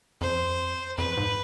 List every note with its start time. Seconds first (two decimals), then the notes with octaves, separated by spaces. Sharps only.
0.21 F2 C5
0.98 F2 B4
1.17 G#2